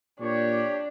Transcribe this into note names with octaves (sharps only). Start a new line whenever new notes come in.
A#2 D4 G4 C#5